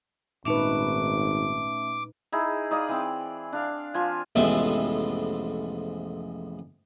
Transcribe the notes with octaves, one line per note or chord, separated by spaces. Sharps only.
G#1 A#2 A3 C#4 D#4 B4 E5 D6
D#4 E4 G#4
D#4 D5 D#5 F5
E3 C4
D4 F5
F3 F4 G#5
A1 F2 C3 G#3 B3 E5